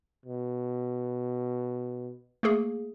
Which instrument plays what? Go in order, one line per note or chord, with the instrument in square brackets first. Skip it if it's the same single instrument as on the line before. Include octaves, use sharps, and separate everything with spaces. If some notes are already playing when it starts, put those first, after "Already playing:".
[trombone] B2
[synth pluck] A3 A#3 G#4